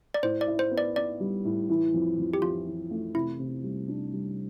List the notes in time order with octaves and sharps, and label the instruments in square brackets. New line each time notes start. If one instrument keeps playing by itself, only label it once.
[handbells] D5
[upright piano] A2 [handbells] C5
[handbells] D5
[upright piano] E4
[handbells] C5
[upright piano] B3
[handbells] D5
[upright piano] B3 [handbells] D5
[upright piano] G3
A2
E3
F2
F2
[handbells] G4
[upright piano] F2 [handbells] F4
[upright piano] E3
A3
[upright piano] C3 [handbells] E4
[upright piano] C3
G3
D4
G3